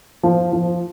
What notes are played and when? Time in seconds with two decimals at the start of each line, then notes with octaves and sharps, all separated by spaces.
0.23 F3
0.53 F3